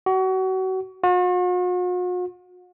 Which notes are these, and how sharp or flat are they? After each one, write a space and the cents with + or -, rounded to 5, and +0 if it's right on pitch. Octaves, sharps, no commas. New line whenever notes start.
F#4 +30
F#4 -45